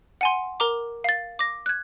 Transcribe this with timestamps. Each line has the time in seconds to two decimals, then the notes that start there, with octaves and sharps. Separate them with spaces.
0.21 F#5 G#5 C6
0.60 A#4 A#5 D6
1.04 F5 A6
1.39 D6 A#6
1.66 F#6 G#6